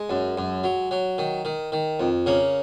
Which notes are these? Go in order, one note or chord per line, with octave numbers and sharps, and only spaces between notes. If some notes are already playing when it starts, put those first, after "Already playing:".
Already playing: G#3
F#2
F#2
F#3
F#3
D#3
D#3
D#3
F2
C#3 A#3